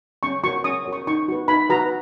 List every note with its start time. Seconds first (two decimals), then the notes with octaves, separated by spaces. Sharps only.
0.23 C#4 C#6
0.44 F#4 A#4 C#5 C#6
0.64 C#4 D#6
0.85 F#4 A#4 C#5
0.93 C#6
1.07 D#4 C#6
1.28 F#4 B4
1.48 D#4 B5
1.69 F#4 B4 A#5